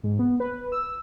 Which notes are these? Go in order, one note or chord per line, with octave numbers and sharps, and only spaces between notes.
G#2
B3
B4
E6